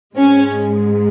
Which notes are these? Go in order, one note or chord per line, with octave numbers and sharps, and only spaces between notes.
G#2 G#3 C#4